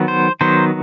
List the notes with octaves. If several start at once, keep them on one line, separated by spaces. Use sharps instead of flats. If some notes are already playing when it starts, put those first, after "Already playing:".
Already playing: D#3 F#3 B3
C5
D#3 F#3 B3 C5